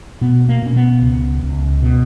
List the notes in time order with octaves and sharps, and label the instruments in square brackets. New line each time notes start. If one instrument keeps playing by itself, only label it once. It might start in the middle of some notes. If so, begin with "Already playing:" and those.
[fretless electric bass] B2 B3
A#3
B2 C#4
B3
C#2
C#2
B2